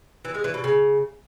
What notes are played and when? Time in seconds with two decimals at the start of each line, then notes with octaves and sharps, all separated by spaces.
0.25 E3
0.34 G#3
0.44 E3
0.54 B2
0.64 C#3